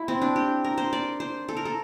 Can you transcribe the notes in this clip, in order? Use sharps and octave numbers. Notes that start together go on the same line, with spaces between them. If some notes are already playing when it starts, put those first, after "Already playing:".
Already playing: E4
C4
D4
G4
A#4
C5
D5
C5
A4
A#4
A4